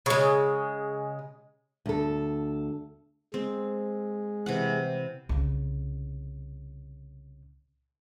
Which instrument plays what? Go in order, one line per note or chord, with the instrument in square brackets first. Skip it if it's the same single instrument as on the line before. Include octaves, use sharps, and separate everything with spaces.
[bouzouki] C#3 G#3
[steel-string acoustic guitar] D2 A4
[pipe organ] G#3 [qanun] C4
[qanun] C3 E3 F#5
[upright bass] C2 C#3